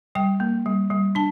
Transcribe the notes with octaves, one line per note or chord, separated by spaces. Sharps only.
G3 G5
A#3
G3
G3
D4 A5